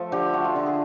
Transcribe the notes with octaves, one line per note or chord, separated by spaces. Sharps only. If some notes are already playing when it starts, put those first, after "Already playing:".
Already playing: F3 A3 A4
D3 G4
A3 F#4
F4
D3
G#4